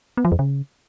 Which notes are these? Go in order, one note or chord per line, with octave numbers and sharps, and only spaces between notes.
B3
F3
F2
C#3